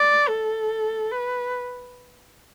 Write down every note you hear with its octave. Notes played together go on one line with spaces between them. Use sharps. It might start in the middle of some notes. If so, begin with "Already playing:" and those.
Already playing: D5
A4
B4